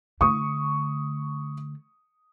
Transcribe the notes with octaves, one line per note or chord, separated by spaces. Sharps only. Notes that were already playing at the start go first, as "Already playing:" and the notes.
D3 A3 C#6 D#6